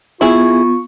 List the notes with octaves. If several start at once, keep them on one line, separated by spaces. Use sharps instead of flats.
B3 E4 F4 G#4 C#6